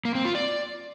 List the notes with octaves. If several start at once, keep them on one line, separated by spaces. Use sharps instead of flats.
A#3
C4
F4
D5